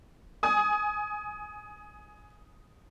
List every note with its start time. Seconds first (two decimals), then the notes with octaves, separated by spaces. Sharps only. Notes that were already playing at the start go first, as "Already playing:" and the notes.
0.43 G#5 D#6